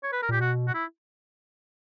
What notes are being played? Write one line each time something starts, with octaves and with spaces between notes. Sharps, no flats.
C#5
B4
A#4
A#2 G4
B2 F#4
F#4
E4